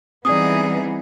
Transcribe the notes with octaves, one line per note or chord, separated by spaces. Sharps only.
E3 G3 B3 C4 D#4 G#4 D5 D#6